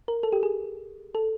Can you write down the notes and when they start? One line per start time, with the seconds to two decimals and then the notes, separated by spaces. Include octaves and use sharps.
0.08 A#4
0.23 A4
0.32 G4
0.43 G#4
1.15 A4